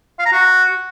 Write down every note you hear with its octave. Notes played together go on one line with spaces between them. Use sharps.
F5
A#5
F#4